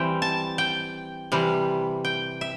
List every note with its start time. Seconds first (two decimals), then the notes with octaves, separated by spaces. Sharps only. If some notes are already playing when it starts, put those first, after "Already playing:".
Already playing: E3 G3 C4 G5
0.22 A5
0.58 G5
1.32 C3 E3 G3
2.05 G5
2.41 E5